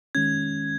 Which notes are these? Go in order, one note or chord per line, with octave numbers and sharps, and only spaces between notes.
D#3 G#3 C#4 G#6